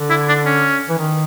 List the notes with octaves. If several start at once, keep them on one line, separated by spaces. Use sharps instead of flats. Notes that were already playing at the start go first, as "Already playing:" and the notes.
Already playing: D3
E4
D4
C#4
E3
D#3